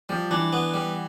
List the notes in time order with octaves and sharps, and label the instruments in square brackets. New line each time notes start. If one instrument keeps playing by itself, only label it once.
[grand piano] F3 [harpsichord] G3
[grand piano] E3 [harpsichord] D4
[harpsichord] B3
G3